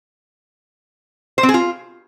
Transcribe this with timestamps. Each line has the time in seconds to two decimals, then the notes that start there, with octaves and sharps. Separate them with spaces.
1.38 C5
1.43 C4
1.49 G#4
1.54 F4